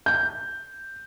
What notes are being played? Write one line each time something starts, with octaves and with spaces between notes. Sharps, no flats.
G6